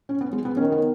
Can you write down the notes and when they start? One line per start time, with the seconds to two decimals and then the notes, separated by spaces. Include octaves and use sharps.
0.09 C#4
0.21 B3
0.33 G#3
0.45 B3
0.57 D#3 C#4
0.72 B3